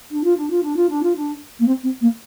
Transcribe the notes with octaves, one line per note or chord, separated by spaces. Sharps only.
D4
F4
D4
F4
D4
F4
D4
F4
D4
A#3
C4
C4
A#3